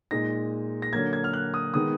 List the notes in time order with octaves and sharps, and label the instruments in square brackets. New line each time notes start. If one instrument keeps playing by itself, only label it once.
[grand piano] A#2 G#3 D#4 A#6
A#6
D3 F#3 A#3 G#6
G#6
F6
F#6
D#6
D#3 G#3 B3 D#6